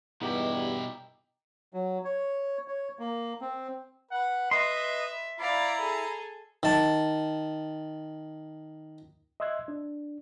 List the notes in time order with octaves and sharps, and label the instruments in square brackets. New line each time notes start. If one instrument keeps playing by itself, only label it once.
[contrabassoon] E2 [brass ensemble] G2 [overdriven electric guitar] B2 E4 [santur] D#4 G4
[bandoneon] F#3
C#5
C#5
A#3
C4
[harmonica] B4 [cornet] F#5
[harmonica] B4 [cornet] D#5 [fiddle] E5 [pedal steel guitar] C6
[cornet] E4 [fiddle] D5 F5 [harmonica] A#5 B5
[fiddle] G#4 A4
[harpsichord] D#3 A5
[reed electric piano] D#5 E5 C6 E6 F#6 G#6
D4